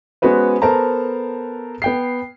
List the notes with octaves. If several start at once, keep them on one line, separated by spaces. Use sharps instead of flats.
G#3 B3 C#4 F#4 B4 C5
B3 A4 A#4 C5 A5 A#5
B3 G5 C7